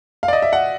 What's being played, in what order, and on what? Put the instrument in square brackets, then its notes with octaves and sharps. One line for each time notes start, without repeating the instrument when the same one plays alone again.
[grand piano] F5
D5
D#5
E5
F#5